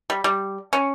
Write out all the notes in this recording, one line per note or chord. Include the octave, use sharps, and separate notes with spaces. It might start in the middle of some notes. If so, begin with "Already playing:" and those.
G3
G3
C#4